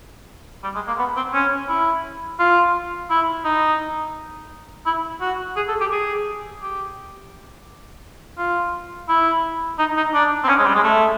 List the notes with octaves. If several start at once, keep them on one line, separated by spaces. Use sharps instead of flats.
G3
G#3
A#3
B3
C4
C#4
E4
F4
E4
D#4
E4
F#4
G#4
A4
G4
G#4
G4
F4
E4
D#4
D#4
D4
C4
C#4
G#3
G3
G#3
A3